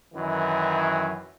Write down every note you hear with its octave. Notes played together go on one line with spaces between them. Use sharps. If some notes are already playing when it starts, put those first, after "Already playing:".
F#2 D#3 E3